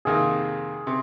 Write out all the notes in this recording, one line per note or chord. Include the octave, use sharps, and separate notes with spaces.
F2 C3 D#3 A#3 G#4
C3